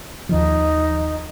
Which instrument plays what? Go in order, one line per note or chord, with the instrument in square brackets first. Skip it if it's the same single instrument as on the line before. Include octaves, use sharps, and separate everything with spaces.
[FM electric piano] D#2 D#3 F3 [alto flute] D#4